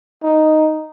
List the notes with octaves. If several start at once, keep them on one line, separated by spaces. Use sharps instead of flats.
D#4